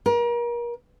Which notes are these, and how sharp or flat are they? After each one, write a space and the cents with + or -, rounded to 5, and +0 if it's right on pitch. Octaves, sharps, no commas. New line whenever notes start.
A#4 +35